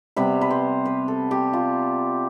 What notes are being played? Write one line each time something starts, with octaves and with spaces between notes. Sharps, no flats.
C3 G3 B3 B4
B4
C5
B4
A4
G4
F4